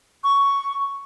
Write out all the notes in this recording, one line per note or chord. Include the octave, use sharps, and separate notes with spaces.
C#6